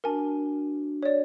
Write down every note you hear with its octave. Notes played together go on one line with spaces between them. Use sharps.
D4 F#4 A#4 G#5 A5
C#5 D5